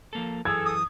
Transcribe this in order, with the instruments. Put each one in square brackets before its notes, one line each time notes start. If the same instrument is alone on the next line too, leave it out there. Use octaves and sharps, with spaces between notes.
[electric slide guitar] F3 A#3 A4
[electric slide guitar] F#2 E3 [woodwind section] G#4 A4 [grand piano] G#6
[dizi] D#6